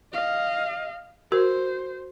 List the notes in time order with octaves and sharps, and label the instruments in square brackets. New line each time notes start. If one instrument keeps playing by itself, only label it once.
[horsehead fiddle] D#5 F5
[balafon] F#4 A#4 [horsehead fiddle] C5